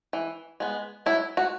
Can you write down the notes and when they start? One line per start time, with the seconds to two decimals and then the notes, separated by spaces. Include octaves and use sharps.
0.13 E3
0.60 G#3 B3
1.06 F#3 E4
1.37 F#4